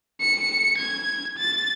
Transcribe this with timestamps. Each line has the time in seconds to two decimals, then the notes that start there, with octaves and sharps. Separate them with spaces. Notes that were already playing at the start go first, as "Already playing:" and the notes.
0.21 C#7
0.78 G#6
1.38 A6